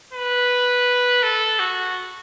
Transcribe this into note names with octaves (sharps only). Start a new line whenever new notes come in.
B4
A4
F#4